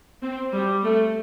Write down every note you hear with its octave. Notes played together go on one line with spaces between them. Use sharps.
C4
G3
A3